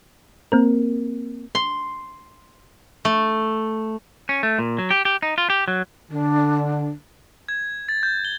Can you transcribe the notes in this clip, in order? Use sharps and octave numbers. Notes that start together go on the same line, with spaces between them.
A#3 C4 A#4
C6
A3
C#4
A3
A#2
F#3
G4
G4
D#4
F4
G4
F#3
D3 D4
G#6
A6
G6
G7